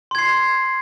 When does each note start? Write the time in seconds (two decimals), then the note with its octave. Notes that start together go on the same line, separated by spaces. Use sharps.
0.11 C6
0.15 G#6
0.18 C7